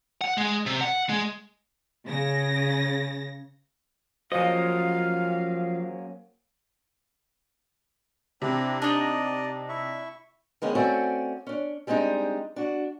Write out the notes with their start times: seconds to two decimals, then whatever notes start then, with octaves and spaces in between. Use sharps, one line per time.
0.21 F#5
0.38 G#3
0.66 C3
0.81 F#5
1.09 G#3
2.06 C#3 A#6
4.32 F3 F#3 A#3 C#4 C5 D#5 F5
8.42 C3 C4 D4 E4
8.82 D4 D#4 D5 D#5 D#6
9.69 E4 E5 C#6
10.62 D#3 G#3 B3 C#4
10.75 A3 C4 C#4 F#4 D5
11.47 C#4 D4
11.87 G3 G#3 C4 D4 D#4
12.56 D4 F#4